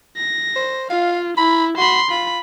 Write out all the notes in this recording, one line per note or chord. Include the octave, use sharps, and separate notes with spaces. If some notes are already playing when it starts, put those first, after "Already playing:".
A#6
C5
F4 F5
E4 B5
F#4 B5 C6
F4 B5